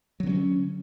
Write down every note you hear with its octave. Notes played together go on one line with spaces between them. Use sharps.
D3 F#3 B3 C#4